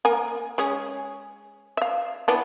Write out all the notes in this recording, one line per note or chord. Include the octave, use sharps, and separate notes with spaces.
A#3 A#4 G#5
G#3 C#4 G#4
E5 F5
E3 B3 D4